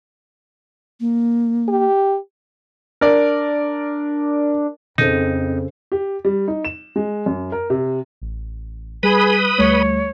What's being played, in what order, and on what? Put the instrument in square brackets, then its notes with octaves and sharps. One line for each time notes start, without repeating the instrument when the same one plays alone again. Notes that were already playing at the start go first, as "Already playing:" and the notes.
[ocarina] A#3
[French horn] G4
[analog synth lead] D4 [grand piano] A#4 D5
[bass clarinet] F2 [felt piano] C#3 A4 C5 [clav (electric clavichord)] D#4
[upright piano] G4
G3
D#4
E7
G#3
F#2
A#4
C3
[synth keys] A1
[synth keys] G3 [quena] G#4 [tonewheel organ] B4 B5 D#6
[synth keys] D2 G3 A3 [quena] C#5